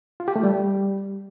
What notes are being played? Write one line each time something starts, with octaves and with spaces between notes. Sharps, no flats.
F4
G4
A3
G3